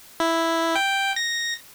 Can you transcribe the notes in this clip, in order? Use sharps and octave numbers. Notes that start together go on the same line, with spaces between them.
E4
G5
A#6